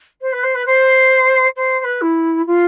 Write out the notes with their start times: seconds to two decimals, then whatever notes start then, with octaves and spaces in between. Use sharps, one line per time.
0.21 C5
0.32 B4
0.43 C5
0.54 B4
0.66 C5
1.56 C5
1.79 C5
1.84 B4
2.01 E4
2.47 F4